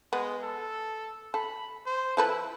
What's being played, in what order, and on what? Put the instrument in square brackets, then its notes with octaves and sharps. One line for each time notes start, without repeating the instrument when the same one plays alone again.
[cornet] G#3 [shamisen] B3
[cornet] A4
[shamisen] A4 [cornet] B5
[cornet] C5
[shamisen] F3 A4 B4 [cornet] E4